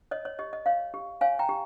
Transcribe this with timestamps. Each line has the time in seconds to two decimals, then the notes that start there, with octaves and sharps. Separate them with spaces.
0.11 C#5 D#5
0.25 C#5
0.39 G4 D#5
0.53 D#5
0.66 C#5 F5
0.94 G4
1.21 C#5 F5 G#5
1.39 G5 A#5
1.49 G4